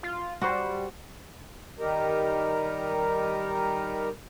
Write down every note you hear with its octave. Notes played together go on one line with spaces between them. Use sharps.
F4
G3 F#4 C5
D#3 G3 D#4 G4 A#4